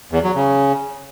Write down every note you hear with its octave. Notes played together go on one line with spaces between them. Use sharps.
E2
F#3
C#3